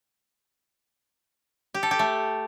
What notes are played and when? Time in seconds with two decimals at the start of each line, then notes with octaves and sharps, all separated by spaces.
1.74 G4
1.83 A4
1.91 G4
1.99 A3